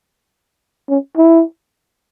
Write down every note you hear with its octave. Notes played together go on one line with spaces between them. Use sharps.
C#4
E4